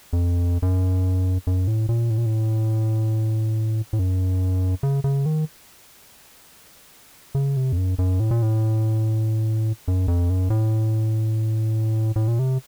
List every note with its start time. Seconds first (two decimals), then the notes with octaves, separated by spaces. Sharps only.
0.13 F2
0.62 F#2
1.47 F#2
1.67 A2
1.89 A#2
2.10 A2
2.18 A#2
2.26 A2
3.93 A2
3.99 F#2
4.83 C#3
5.04 C#3
5.26 D#3
7.35 C#3
7.57 C3
7.72 F2
7.77 F#2
7.99 F#2
8.20 A2
8.31 A#2
8.42 A2
9.88 F#2
10.08 F2
10.30 F#2
10.50 A2
12.16 A2
12.28 A#2
12.39 C3